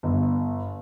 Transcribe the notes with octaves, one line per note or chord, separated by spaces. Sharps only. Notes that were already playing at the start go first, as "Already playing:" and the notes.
G1